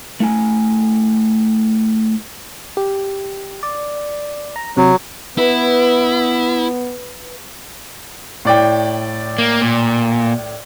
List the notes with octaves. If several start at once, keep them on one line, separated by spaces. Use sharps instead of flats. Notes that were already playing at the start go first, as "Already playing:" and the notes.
A3 E4 G#5
G4
D5
A#5
C3 F#3
B3 E4 B4
A2 D5 G5
A#3
A#2